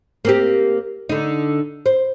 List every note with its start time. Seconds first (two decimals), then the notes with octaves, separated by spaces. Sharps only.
0.25 A#3 C4 G4
1.09 D3 D#4
1.86 C5